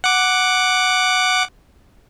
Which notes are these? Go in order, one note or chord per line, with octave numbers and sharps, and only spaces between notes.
F#5 D6